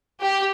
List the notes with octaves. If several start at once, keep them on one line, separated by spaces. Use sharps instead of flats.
G4